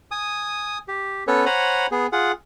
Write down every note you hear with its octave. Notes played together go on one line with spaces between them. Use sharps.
G#5 D#6
G4
B3 C#4 A4 B4 C#5
C5 C#5 F#5 G#5 A#5 B5
B3 G#4
F4 G#4 F#5